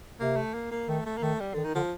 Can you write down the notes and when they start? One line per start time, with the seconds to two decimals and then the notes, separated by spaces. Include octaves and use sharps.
0.19 C3 A#3
0.36 A3
0.54 A#3
0.71 A#3
0.88 D#3 A3
1.05 A3
1.17 A#3
1.22 D#3 A3
1.40 G3
1.54 D3 D#3
1.64 D#3
1.75 D3 F3